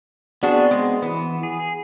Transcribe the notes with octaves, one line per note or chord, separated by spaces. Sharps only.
B3 C4 D4 F#4 G#4
G#3
E3 B3
G#4